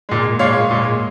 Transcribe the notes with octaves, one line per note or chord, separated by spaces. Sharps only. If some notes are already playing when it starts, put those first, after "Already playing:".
A#2 G#3
A#2 G#3 C#5 F5
A#2 G#3